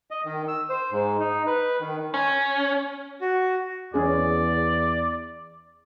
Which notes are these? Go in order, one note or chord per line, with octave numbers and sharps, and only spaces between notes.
D#5
D#3
E6
C5
G#2
D#4
B4
D#3
C#4
F#4
E2 C#4 G#4 D5